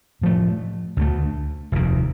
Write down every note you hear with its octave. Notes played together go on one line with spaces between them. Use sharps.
A2 F3 A3
D2 D3 F3 A3
F1 D#2 D#3